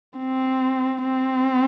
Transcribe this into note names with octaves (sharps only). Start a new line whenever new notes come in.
C4
C4